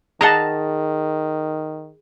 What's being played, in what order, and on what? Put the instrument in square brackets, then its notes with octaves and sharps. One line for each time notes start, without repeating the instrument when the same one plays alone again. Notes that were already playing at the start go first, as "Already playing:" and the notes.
[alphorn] D#3 [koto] G#4 D#5 F#5 [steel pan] A5 A#5